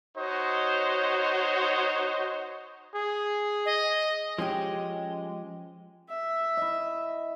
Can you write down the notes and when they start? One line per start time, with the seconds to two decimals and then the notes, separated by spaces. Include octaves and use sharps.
0.17 D#4 F#4 C5 C#5 D#5
2.95 G#4
3.65 D#5
4.39 F3 G#3 C#4 G4
6.09 E5
6.57 E4 D#5